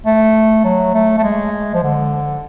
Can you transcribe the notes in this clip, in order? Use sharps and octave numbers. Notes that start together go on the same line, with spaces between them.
A3
F#3
A3
A3
G#3
F3
D3